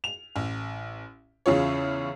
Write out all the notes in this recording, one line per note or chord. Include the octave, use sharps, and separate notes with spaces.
F7
A1
E2 C#3 F4 C#5